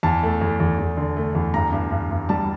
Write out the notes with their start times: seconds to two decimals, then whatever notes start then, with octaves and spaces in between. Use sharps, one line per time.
0.03 E2 A5
0.23 A3
0.41 E2
0.60 E2
0.78 E2
0.97 D3
1.16 A3
1.35 E2
1.54 G2 A#5
1.73 G2
1.91 G2
2.11 G2
2.29 G3 A5